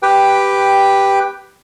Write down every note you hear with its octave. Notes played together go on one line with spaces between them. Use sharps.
G4 B4 G5